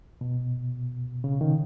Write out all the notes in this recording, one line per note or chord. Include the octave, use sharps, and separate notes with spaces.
B2
C#3
D#3